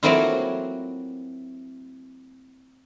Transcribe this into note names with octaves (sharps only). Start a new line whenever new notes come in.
F#3 A3 A#3 C4 E4 F4